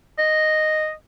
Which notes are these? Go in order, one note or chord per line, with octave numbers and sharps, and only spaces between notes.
D#5